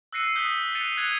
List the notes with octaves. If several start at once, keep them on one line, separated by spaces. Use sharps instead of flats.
E6 F#6 A#6 C7 C#7 D#7
D#6 F#6 G6 B6 G7
F#6 A6 C#7 D#7 F7 G7
F#6 G#6 A6 C#7 D#7 F7